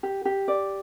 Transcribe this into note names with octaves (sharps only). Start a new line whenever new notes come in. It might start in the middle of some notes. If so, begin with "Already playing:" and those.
G4
G4
D5